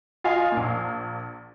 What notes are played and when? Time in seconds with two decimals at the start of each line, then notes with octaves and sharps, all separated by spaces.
0.24 F4 D#5 F5 G#5
0.52 A#1 A#3